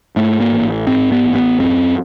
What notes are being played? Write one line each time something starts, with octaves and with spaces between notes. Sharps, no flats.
G#2 A3
A#3
A1
G#2 C4
B3
A1
B3
F#2 C4